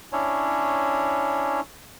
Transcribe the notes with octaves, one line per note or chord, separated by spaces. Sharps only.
C#4 D4 E4 C#5